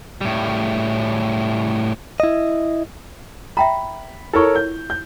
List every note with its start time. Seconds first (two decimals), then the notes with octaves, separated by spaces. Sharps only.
0.21 A2 G3
2.20 E4 D#5
3.57 E5 G5 A#5 B5
4.33 E4 F4 A4 A#4 C#5 C#6
4.56 G6
4.90 G6